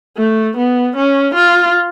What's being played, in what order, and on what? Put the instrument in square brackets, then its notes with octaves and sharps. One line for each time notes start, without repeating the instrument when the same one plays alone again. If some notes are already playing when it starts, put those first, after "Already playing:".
[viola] A3
B3
C#4
F4